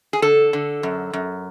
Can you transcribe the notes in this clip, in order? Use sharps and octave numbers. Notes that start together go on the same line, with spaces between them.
G#4
D3 A4
D3
F#2
F#2